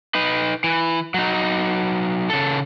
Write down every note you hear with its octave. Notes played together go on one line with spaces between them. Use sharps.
D#4 B4
E3
F#3 D#4
C#3 A4